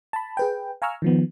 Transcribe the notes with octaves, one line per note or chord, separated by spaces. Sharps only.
A5 B5
G#4 B4 G5
F5 G#5 A#5 C#6 E6 F6
D#3 F3 B3